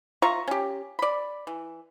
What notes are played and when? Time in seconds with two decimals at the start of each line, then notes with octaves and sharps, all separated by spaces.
0.22 F4 E5 A#5 C#6
0.48 C#4 G4
0.99 D5 B5
1.47 E3